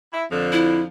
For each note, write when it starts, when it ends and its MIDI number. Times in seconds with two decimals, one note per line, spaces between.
0.13 0.24 64
0.31 0.85 41
0.31 0.85 50
0.31 0.85 53
0.52 0.80 64